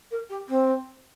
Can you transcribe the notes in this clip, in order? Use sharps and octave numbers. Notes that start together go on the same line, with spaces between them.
A#4
G4
C4